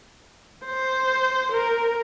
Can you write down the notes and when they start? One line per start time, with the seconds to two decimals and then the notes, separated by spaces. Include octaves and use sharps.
0.65 C5
1.52 A#4